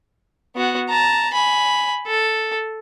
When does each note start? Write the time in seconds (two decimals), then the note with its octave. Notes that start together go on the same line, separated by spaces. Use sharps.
0.56 B3 F#4
0.89 A5 A#5
1.33 G#5 B5
2.07 A4